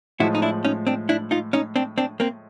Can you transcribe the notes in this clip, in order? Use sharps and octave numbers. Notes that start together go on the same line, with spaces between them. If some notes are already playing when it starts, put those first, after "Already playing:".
A2 F3 G#3 E4 F#4
D#4
D4 E4
C#4 D#4
C4 D4
D4 E4
D#4 F4
C#4 D#4
C4 D4
C4 D4
A#3 C4